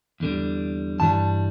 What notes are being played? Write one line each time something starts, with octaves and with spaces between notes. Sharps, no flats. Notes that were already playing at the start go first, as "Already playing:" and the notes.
E2 D3 G3
G2 E3 G3 A5